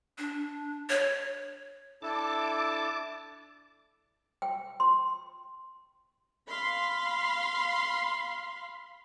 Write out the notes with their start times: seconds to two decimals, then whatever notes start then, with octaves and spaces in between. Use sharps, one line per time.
0.18 D4
0.89 C#5
2.02 D4 E4 A4 A5 D6
4.42 G5
4.80 C6
6.48 F5 B5 C6